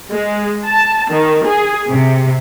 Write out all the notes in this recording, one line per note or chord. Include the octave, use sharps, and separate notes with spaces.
G#3
A5
D#3
G#4
C3